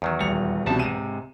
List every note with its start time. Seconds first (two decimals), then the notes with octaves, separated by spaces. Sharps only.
0.02 E2 D#3 F#3
0.20 D#1 G3 F7
0.66 C2 B2 F3 A5
0.79 G#2 C3 D#7 E7